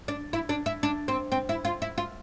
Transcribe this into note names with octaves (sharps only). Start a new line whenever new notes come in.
D4
E4
D4
E4
D4
C4
C4
E4
F4
E4
F4